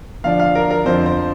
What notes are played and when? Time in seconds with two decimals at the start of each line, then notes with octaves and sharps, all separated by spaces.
0.24 D3 F3 D4 F5
0.40 F5
0.55 A#4
0.71 A#4
0.85 F2 D3 F3 C4 C5
1.06 C5